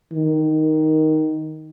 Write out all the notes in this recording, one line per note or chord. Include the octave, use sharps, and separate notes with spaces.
D#3